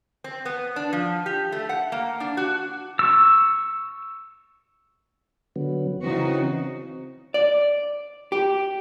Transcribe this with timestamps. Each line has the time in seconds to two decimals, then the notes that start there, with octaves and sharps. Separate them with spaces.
0.24 C4
0.45 B3
0.76 D4
0.93 F3
1.26 G4
1.52 A3
1.69 F#5
1.92 A#3
2.20 D4
2.37 F#4
2.99 C#6 E6
5.56 D3 F#3 B3
6.03 C#3 E3 C4 D#4 F#4
7.34 D5
8.32 G4